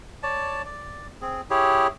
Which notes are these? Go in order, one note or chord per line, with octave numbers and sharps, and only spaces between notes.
C#5 D5 A5
D5
C4 G#4
E4 G4 G#4 C#5